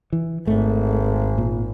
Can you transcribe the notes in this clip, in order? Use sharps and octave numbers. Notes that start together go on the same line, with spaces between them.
E3
G#1 A3
A#2